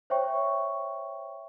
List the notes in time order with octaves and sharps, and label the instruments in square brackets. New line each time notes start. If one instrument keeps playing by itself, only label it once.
[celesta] C5 C#5 E5 G5 C#6